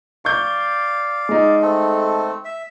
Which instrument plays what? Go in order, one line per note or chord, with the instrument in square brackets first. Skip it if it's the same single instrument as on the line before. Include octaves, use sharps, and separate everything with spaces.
[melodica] D5 F5 [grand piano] C#6 G6
[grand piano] G#3 D#4
[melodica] A3 C4 A4
E5